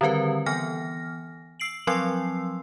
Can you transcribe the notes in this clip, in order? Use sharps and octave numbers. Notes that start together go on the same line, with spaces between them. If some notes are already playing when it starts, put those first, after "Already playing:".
D3 D#3 G3 C4 A#4 B4
E3 B3 G#5 F6 A#6
E6 C7 D7 F#7
F3 F#3 C4 C6 E6 C7